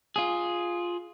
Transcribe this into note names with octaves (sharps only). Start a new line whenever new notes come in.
F4 G#4